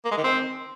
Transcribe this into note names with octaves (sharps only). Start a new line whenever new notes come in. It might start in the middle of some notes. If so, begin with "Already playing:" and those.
A#3
G#3
D#3
C4